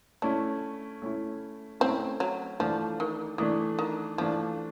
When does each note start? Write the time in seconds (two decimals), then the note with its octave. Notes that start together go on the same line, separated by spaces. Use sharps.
0.22 A3 C#4 D4 E4
1.02 A3 C#4 E4
1.80 A3 C4 C#4 E4
2.20 F#3
2.59 E3 F3 A3 D4
3.00 D#3
3.38 D#3 E3 A3 D4
3.79 D#3
4.18 E3 F3 A3 D4